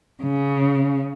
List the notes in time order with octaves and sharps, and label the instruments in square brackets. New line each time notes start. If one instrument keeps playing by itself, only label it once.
[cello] C#3